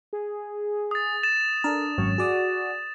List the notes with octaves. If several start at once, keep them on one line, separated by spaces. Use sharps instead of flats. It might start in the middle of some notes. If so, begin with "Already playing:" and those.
G#4
D#6 A6
A6 E7
D4 A4 A#4
G#1 F#2 C#5
F#4 G#4 D5 D#6